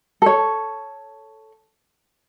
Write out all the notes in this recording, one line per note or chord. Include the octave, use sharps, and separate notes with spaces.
A4 C#5